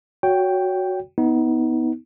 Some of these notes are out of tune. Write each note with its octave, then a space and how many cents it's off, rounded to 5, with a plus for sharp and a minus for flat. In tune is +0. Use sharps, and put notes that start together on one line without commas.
F#4 +0 C#5 +20 G5 +0
B3 +5 D#4 +30